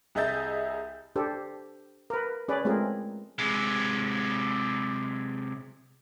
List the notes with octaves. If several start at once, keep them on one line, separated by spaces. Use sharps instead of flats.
C2 G#4 D#5 E5 G6 A6
D4 G4 A4 C5
A#4 B4
C#4 G#4 B4 D5
G#3 A3 C4 F4 G#4 A#4
C3 G#3